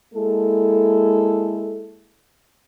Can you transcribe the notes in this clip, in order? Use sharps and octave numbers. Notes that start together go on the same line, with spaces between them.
G#3 A#3 E4 A4